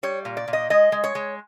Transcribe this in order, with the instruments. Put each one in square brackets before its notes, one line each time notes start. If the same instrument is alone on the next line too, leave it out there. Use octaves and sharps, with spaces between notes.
[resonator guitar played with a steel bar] G3 C#5
A#2
D5
A#2
D#5
G#3 D#5
G#3
C#5
G#3